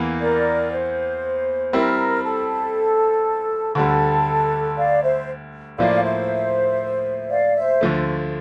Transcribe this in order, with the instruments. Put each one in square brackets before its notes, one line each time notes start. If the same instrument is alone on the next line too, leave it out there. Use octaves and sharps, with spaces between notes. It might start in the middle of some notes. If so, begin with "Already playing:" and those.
Already playing: [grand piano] E2 E3 A#3
[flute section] A#4 D5
C5
[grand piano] G3 C4 E4 [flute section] A#4
[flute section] A4
[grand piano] D2 D3 G3 [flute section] A4
[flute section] D5 F5
C5 E5
[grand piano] A2 F3 A#3 [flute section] D5 F5
[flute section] F5
C5 E5
D5 F5
C5 E5
[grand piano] D2 D3 F3 A3